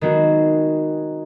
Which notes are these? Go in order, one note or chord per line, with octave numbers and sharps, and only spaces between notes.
D#3 G#3 B3 C4 F#4